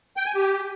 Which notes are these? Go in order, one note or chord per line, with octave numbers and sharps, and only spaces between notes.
G5
G#5
G4